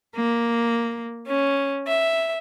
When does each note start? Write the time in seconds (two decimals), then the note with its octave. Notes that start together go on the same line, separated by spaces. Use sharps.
0.15 A#3
1.27 C#4
1.87 E5